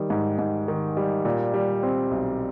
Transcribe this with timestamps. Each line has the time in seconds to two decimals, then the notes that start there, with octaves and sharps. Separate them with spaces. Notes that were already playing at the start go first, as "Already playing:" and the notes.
Already playing: D#3 G3
0.10 G#2
0.39 G#2
0.68 D#3
0.97 G3
1.25 A#2
1.54 G3
1.83 C4
2.11 B1